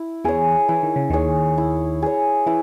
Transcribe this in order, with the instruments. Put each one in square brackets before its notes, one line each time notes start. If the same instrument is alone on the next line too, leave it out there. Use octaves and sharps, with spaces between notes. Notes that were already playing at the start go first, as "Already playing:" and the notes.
Already playing: [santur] E4
[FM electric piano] E2 E3 [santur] G#4 C#5
[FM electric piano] E3 [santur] E4
[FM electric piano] D#3
C#3
[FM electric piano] D#2 D#3 [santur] G#4 C#5
[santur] E4
G#4 C#5
[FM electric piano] E3 [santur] E4